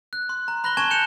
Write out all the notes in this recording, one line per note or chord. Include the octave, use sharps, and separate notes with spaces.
F#6
C6
A#5
B5 F#6 A#6 F#7 G7
G#5 A5 C#6 G#6 E7 G7
F#6 G6 C#7 E7 F7